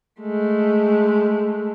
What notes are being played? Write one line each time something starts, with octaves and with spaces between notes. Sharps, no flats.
G#3 A3